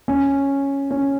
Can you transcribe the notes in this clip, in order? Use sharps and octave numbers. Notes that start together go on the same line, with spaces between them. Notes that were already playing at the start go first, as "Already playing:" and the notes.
C#4
C#4